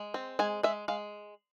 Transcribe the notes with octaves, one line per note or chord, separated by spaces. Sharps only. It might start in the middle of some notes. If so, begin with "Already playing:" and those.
Already playing: G#3
C4
G#3 G#5
G#3 E5
G#3 F5